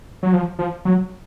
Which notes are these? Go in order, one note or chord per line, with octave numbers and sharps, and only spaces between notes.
F#3
F3
F3
F#3